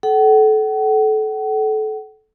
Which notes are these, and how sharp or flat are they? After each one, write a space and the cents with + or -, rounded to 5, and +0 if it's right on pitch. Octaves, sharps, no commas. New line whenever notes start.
A4 -25 F#5 +40